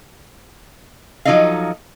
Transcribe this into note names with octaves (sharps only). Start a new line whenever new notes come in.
F3 F#3 D#4 A4 D#5 F5